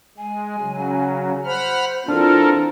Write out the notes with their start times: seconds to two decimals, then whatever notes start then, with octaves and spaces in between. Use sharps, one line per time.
0.18 G#3 G#5
0.59 C#3 F#3
1.45 C5 F#5 B5 F6
2.08 E3 C4 D4 F4 A4 A#4 F6